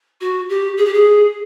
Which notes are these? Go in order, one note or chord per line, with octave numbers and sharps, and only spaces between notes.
F#4
G4
G#4
G4
G#4